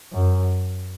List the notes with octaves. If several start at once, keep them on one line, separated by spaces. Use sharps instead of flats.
F#2